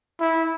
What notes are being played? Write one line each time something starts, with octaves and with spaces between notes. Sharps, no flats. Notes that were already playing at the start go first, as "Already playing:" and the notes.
E4